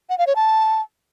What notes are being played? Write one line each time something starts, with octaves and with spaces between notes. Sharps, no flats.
F#5
F5
C#5
A5